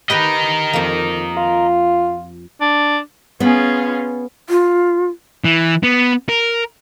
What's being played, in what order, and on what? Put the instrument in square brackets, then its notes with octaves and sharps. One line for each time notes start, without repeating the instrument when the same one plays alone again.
[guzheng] G4 B4 G5 [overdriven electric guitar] A#4 D#5
[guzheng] F2 A#3
[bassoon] F4
[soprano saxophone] D4
[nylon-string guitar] B3 [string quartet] C#4 F4 G#4
[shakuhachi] F4
[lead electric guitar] E3
B3
A#4